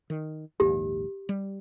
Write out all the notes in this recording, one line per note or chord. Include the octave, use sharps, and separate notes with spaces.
D#3
A#1 D#2 G#2 G4
G3